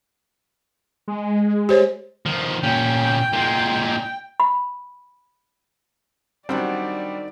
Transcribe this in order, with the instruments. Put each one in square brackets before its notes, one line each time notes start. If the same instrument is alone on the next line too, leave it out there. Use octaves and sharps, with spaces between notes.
[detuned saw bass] G#3
[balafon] G4 C5 C#5
[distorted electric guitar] D#3 F3
[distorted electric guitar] A#2 C#4 [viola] G5
[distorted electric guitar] A#2 G#3
[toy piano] B5
[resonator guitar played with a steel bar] D#3 D#4 F#5 [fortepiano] F#3 C4 [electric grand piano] G3 D4 [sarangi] D5